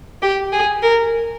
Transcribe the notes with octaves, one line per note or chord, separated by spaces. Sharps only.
G4
G#4
A#4